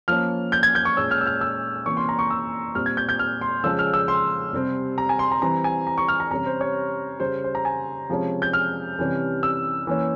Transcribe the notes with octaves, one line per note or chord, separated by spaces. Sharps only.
F3 A#3 C#4 F6
G6
G#6
G6
C#6
A#2 G#3 C#4 E6
F6
E6
F6
E6
C3 E3 A#3 C#4 C#6
C6
A#5
C#6
E6
A#2 G3 C4 F6
G#6
G6
G6
F6
C6
C#3 F3 G#3 C#4 E6
F6
E6
C6
C3 G3 C4
A#5
G#5
C6
A#5
E3 G3 C4 A#5
G#5
A#5
C#6
F6
A#5
C3 E3 G3 C#4 A#5
C5
C#5
C#3 G3 C#4 C5
C5
A#5
G#5
C3 F3 G#3 C#4
G6
F6
C3 E3 G3 C#4
E6
E3 A#3 C#4